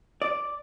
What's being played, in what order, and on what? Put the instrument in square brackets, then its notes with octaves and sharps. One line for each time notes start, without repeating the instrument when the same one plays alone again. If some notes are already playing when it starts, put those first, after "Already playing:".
[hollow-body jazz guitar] D5